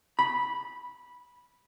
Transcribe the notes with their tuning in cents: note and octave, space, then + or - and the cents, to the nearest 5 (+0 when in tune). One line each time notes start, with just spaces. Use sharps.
B5 -10